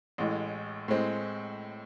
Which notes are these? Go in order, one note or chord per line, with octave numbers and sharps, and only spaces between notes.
A1 A2 G#3
A2 G#3 C4